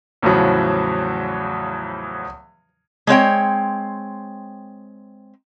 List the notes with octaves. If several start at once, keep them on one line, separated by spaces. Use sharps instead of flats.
E2 A2 C#3 F3 F#3
G#3 C4 C#5 G5